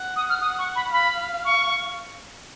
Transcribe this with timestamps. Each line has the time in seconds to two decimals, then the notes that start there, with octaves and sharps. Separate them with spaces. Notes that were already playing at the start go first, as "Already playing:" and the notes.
Already playing: F#5
0.16 D#6
0.29 F6
0.41 F#5 D#6
0.59 C#6
0.76 B5
0.93 F5 B5
1.45 C#6